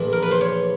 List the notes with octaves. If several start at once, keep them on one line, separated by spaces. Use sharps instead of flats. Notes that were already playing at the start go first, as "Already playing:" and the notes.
Already playing: A#1 A2 E3
A#4
B4
C5
C#5